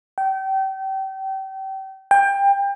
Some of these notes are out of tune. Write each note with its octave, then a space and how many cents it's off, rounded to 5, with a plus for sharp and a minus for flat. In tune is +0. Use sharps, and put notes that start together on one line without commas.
G5 -30
G5 +25